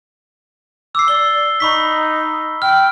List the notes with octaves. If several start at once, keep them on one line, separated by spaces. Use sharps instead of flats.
D6 E6 C7
D5 G7
D#4 B5 C#6 B6
G5 F6